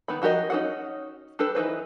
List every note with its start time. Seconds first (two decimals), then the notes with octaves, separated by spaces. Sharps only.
0.08 D#3 B3 B5
0.22 F3 F#4 G4 A#4 D#5
0.50 C#4 D#4 F#4 G#4 F#5
1.39 D4 G4 A4 B4
1.55 E3 D#4 B4 C5